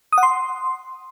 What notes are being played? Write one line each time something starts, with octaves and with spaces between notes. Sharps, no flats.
D#6
F#5
C6